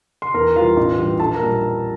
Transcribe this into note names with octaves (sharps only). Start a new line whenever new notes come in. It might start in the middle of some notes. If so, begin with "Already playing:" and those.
C6
E2 A#4 A#5
E3 G3 F4 F5
A1
G2 E3 G3
A#1 A4 A5
A#4 A#5
A#2 G3